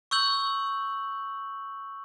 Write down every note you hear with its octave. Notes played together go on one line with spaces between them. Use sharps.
C#6 E6 G6 F#7